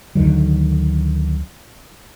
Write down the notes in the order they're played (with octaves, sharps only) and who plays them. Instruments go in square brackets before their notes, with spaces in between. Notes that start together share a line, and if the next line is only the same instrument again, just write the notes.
[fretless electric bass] D2 D3 D#3 F#3